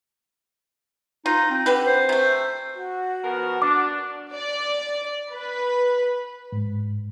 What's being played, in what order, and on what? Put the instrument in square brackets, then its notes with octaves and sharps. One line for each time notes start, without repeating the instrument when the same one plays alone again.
[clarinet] D#4 [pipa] F4
[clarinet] C4
[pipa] D3 G4 B4
[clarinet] C5
[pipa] C3 A3
[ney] F#4
[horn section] F3 B3 A#4
[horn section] D4 [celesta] D6
[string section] D5
B4
[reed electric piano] G#2